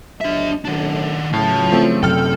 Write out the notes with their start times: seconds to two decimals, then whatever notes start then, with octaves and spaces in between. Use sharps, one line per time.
0.21 G1 F#3 D4 D#5 E5
0.64 B1 F#2 A2 D#3 D4
1.33 A2 C#3 E3 F#3 F4 A5
1.71 F3 A3 C4
2.03 F#2 C3 A4 G5 F6